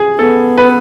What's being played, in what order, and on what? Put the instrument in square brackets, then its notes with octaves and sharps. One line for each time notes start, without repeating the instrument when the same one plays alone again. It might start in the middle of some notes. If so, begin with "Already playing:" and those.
Already playing: [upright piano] G#4
[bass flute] B3 [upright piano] A4
[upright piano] B4